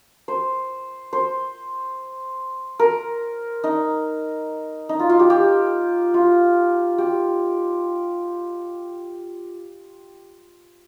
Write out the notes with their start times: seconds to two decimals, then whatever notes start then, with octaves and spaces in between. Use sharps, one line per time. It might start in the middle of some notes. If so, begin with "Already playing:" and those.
0.28 C5
1.13 C5
2.79 A#4
3.64 D#4
4.89 D#4
4.99 F4
5.10 F4
5.19 G4
5.30 G4
6.14 F4
6.98 G4